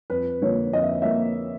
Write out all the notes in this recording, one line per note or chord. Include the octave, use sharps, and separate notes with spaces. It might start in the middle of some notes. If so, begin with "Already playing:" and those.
F2 B4
D3 F3 A#3 C#5
F2 D#5
E5
D#5
A#3 E5